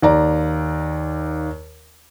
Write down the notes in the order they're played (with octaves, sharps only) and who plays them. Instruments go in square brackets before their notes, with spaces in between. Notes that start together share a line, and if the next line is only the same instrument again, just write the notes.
[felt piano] D#2 D5 A#5